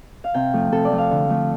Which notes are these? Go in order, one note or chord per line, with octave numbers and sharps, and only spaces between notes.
F5
C3 G5
F3 A3
C3 A4
D5
F3 A3
F5
D3
F3 A3